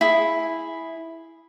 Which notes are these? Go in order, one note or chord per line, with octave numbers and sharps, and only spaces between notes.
E4 G#4